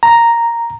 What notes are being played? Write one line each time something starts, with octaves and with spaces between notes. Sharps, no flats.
A#5